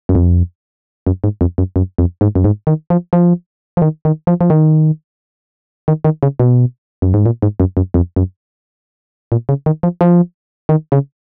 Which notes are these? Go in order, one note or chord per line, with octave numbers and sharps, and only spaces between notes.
F#2
F2
F#2
G#2
F2
F#2
F#2
F2
G#2
F#2
G#2
D#3
F3
F3
F3
D#3
D#3
F3
F3
D#3
D#3
D#3
C#3
B2
F#2
G#2
A#2
G#2
F#2
F#2
F2
F#2
A#2
C#3
D#3
F3
F3
D#3
C#3